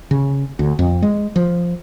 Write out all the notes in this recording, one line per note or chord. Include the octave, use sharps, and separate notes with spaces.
C#3
D2
F2
G#3
F3